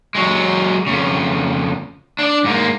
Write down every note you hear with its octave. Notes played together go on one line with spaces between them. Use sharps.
F#3 G#3
F2 C#3
D4 D5
G#2 A#3